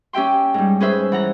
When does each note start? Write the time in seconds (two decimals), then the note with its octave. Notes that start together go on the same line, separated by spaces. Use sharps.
0.13 C#4 G4 E5 G5 C6
0.54 G#2 G3
0.80 C#4 G#4 B4 C5 E5
1.12 E3 F#5 A#5